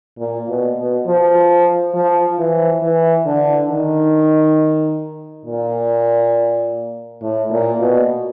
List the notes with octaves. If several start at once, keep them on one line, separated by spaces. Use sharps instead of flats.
A#2
B2
B2
F3
F3
E3
E3
D3
D#3
A#2
A2
A#2
B2